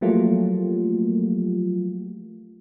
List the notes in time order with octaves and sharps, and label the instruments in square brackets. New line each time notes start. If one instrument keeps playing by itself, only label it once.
[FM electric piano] F3 F#3 A3 A#3 F4 G4